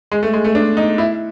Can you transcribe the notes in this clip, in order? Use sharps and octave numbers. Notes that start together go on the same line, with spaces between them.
G#3
A3
G#3
A3
D4
D#4
E4